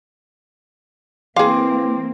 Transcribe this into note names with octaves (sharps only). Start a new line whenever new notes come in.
E3 A#3 C4 G#4 F5 G5 C6 D6